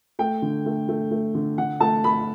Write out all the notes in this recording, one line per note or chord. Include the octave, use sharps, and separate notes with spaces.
A3 G5
D3
A3
A3
A3
D3
D3 F#5
A3 A5
A3 B5